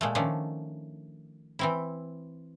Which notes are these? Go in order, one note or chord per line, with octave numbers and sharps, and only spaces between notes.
A#2 G#3 A3
D#3 F3 A3 C#4 D4
E3 C4 E4